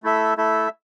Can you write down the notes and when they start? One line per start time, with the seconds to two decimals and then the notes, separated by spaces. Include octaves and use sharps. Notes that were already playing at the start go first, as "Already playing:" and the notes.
0.03 A3 E4 A4 E5
0.37 A3 E4 A4 E5